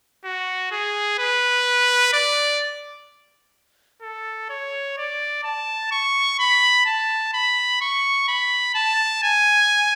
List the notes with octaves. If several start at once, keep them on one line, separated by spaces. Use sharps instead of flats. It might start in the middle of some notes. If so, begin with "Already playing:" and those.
F#4
G#4
B4
D5
A4
C#5
D5
A5
C#6
B5
A5
B5
C#6
B5
A5
G#5